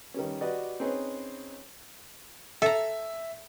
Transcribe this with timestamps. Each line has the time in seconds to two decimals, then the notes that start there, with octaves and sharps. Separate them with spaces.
0.14 D#3 G3 C#4
0.41 F#4 G4 B4 D5 D#5
0.80 C4 C#4 D#4 G#4 B4 C#5
2.62 A4 E5 A#5